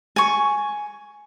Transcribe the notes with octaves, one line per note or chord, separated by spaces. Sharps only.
G#5 C#6